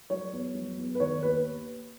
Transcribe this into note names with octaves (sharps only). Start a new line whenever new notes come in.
F#3 C#5
E2
F#3
E2
B4
D#3 C#5
D#2 B4